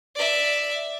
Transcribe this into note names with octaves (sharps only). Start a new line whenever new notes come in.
D5 E5